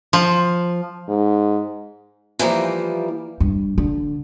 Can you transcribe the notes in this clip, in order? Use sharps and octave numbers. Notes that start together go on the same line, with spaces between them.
F3
G#2
E3 F3 G3 A#3
G2
D3